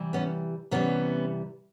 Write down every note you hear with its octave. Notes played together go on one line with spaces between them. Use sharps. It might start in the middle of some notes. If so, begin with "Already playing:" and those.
Already playing: C3 E3 G3
B3 C#4
C3 E3 G3 B3 C#4